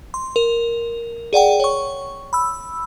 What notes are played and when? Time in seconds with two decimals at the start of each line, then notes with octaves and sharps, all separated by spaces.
0.14 C6
0.36 A#4
1.33 G#4 D5 F#5 G5
1.60 C#5 C#6
2.33 B5 E6